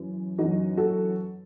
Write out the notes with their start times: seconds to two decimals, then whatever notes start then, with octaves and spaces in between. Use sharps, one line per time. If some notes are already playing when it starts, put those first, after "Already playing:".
Already playing: F#2 E3
0.38 F#2 E3 D#4 F#4
0.77 F#4 A4